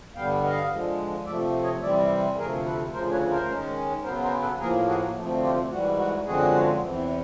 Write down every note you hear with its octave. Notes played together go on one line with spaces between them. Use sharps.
G2 D3 G3 B3 F5 G5
D#5 F5
D3 F3 G#3
C3 F3 A3 D5 E5
C#5 D#5
C3 E3 G3 C4 D5 E5
D2 C3 F3 A3 G#4 A#4
A4 B4
D2 C#3 F3 A#4 C5
B4 C#5
A#4 C5
D#3 G#3 C#4
C#3 F#3 B3 A#4 C5
A#4 C5
A4 B4
A2 F3 A#3 G#4 A#4
F#4 G#4
D2 C3 F3 A3
F4 G4
G#2 E3 G3 F#4
F#4
F#2 D3 F3 G#3 C4 F#4 G#4
E2 C3 E3